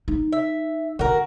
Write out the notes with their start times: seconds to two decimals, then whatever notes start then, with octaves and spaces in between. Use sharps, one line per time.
0.08 D#4
0.33 E5
0.99 D3 F#4 A#4